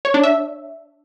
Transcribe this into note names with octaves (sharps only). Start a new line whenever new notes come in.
C#5
D4
E5